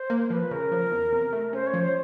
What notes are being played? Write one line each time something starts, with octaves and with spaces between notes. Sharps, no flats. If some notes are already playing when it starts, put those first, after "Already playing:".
Already playing: C5
A#3
F3 B4
C#3 A#4
F3
E2
C3
A3
C#4 C5
C#5
F3
C5